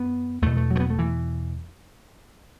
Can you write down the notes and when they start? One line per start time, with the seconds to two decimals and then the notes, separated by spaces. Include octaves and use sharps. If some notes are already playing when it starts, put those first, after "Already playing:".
Already playing: F#2 B3
0.42 E2 B2 A3
0.57 A3
0.71 F#3 A3
0.80 B3
0.90 A3
0.99 E3